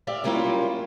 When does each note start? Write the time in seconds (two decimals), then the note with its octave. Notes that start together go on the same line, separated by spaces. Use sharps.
0.07 G4 D5 E5 F5
0.24 F#3 G3 A#3 C#4 E4 F4